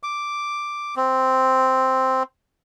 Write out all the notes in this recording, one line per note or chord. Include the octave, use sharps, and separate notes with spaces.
D6
C4